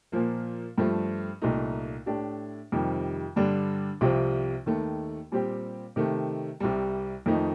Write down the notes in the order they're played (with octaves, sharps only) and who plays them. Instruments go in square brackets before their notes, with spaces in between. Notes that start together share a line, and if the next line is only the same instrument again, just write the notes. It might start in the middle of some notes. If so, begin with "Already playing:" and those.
[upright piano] A#2 F3 A#3
G2 F3 A3
C2 A#2 A3 D#4
A2 A3 D4 G4
F2 C3 D#3 G3
G2 D3 G3 D4
C2 C3 F3 C4 F4
D#2 D#3 A3
A#2 G3 C4 G4
C3 D#3 A3
C2 C3 G3
F2 D#3 A3 D#4